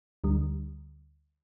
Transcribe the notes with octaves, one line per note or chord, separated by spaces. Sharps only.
D2 D3 G3